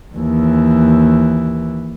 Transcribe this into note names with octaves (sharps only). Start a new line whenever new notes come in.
D#2 E3